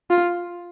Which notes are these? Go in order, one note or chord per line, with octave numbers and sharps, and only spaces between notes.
F4